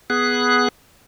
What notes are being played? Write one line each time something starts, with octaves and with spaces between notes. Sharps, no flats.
B3 G#4 F#6